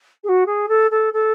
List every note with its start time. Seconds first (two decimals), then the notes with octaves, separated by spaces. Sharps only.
0.24 G#4
0.29 F#4
0.46 G#4
0.68 A4
0.91 A4
1.13 A4